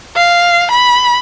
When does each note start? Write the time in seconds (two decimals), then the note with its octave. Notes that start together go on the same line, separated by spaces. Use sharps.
0.16 F5
0.71 B5